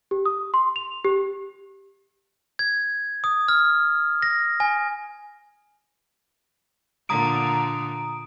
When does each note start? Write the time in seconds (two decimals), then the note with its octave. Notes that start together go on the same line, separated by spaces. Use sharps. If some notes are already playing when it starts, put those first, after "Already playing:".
0.11 G4
0.26 D#6
0.54 C6
0.76 F7
1.04 G4
2.59 G#6
3.24 D#6
3.48 F6
4.22 A#6
4.60 G#5
7.09 A#2 D3 A#5 D#6 D7